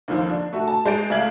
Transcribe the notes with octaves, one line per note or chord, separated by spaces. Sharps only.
D#2 D3 D#3 F3
D4
A3 F#4 A4
A5
G#3 G6 A6 D7
C#2 A3 F5 G#6 F#7